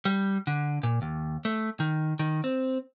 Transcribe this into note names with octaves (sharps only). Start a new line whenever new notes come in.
G3
D3
A#2
D#2
A3
D#3
D#3
C4